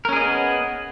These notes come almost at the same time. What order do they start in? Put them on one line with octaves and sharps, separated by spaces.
A#4 C#4 G#4 D#5 B3